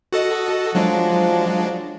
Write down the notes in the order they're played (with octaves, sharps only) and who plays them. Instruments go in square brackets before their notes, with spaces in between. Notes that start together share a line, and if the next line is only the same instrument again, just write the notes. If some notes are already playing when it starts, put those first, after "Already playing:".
[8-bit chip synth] F#4 A4 D#5
[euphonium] F3 [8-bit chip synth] F#3 G#3 D4